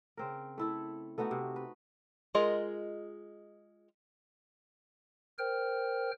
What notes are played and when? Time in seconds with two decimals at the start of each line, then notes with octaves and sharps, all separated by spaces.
0.17 C#3 C4 A#4
0.58 A3 E4 A4
1.18 A3 B3 D#4 F#4
1.31 C3
1.56 B4
2.35 G#3 F4 G#4 A#4 D#5
5.39 A#4 C5 G5 F6